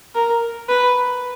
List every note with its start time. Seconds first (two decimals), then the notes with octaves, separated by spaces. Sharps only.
0.15 A#4
0.69 B4